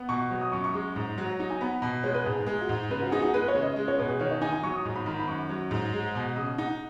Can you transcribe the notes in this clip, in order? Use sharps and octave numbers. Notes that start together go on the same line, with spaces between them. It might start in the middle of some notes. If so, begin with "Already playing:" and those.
Already playing: B3
B2 C#6
F#3
D#6
F#2 C#6
C#6
G#3
G#2
F#3
D#4
G#5
B3 B5
B2 B5
G#3 C#5
B4
G#2 G#4
G#4
G#3 G#4
F#4
G#2
C#3 B4
F#4
D#4 G#4
F#4
G#4
G#3 B4
C#5
C#3
D#5
G#3
C#5
B2 B4
G#4
D#3 C#5
D#5
D#4 G#5
G#5
F#3 C#6
D#6
G#2
B5
D#3 B5
B5
F#2 C#6
F#3
G#2
G#3
B2
C#3 D#6
D#4 F#5